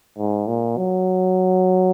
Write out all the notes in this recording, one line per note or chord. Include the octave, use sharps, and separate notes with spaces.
G#2
A#2
F#3